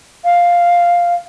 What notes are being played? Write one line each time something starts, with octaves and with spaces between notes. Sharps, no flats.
F5